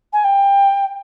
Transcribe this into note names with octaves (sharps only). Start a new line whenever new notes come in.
G#5
G5